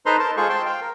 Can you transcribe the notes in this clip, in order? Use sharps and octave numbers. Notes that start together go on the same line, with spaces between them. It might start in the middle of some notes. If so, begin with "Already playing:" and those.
D#4 A4 B4 C5 A#5 C6
A#4 C5 A5
G#3 F4 G#4 A4 C5 C#6
C5 G5 A5 C6
F5 G5
A#4